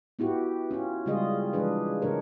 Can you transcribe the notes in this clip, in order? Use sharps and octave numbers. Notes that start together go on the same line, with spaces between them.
B3 E4 F#4 G4
C#4 F4
C#3 G3 G#3 F4 G#4 D#5
E3 F3 G#3 D4 G#4 B4
C#3 F#3 D4 A#4 C#5